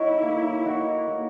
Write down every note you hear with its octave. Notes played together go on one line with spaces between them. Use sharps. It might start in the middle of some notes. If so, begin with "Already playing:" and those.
Already playing: D#4 E4 F#4 C#5
A#3
D#4 F#4 C#5
A#3